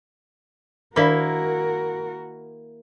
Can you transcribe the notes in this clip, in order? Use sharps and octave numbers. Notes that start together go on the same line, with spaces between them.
D#3 A#3 D4 E4 F#4 A#4 D5